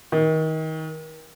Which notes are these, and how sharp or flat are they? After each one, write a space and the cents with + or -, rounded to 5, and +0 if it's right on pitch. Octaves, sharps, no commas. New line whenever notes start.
D#3 +30